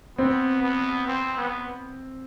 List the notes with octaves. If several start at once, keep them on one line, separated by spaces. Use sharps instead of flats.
B3 C4
B3
C4
B3